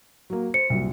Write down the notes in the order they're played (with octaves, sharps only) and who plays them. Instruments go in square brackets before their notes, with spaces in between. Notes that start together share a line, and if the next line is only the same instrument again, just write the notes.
[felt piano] F#3 A#3
[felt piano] C5 [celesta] C#7
[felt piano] C2 F#2 A#2